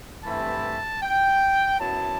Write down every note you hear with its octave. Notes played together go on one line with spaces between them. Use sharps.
G2 E3 A3 C4 E4 A5
G5
F#2 F#3 B3 E4 A5